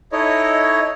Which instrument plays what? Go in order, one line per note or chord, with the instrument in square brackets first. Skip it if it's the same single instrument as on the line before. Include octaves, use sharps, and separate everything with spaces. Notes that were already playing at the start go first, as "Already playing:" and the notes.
[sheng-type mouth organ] D#4 E4 A4 C#5 D#5